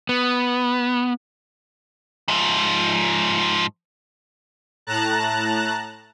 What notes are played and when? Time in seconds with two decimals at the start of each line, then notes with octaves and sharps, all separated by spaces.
0.09 B3
2.28 G#2 F3
4.87 A2 A5 A#5 F#6